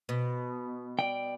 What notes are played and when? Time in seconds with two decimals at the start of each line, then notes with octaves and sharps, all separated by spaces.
0.09 B2
0.99 D5 G5